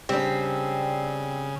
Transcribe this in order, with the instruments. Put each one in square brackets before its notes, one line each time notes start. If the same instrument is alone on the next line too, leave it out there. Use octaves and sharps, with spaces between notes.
[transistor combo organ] C#3 [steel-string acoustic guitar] G3 D4 [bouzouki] C4